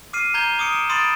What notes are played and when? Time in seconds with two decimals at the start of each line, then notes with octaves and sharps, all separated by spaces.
0.13 D6 F6 C7 D#7
0.34 A#5 G6 G#6 G7
0.59 D6 D#6 C#7 D7
0.73 E7
0.89 B5 C6 D#6 A6 D7 E7